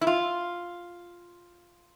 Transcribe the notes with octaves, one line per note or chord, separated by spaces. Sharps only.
E4
F4